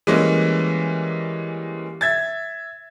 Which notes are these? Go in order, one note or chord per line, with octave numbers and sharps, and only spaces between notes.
E3 G3 G#3 A#3 C#4
E5 G#6 A6